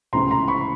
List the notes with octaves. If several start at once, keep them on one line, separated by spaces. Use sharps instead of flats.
C#2 C3 E3 A3 A#5 C6
A#5 C6
B5 C#6